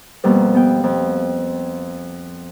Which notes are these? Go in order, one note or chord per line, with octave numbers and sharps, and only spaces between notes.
F2 B2 G3 A#3
B3 F5 G5
F2